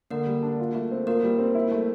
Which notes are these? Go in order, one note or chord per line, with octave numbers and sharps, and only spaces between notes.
D3 A#3 A#4
G3
D4
F4
A3
C4
A#3 F4 A#4
G3
C4
E4
A3